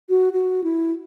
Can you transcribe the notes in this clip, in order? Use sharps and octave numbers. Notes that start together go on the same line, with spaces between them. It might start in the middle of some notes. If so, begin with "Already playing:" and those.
F#4
F#4
E4